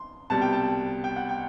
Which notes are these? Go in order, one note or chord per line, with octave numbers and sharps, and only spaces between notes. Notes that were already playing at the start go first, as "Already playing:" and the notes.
Already playing: C6
C2 B2 G3 A5
G5
A5
G5
F#5
G5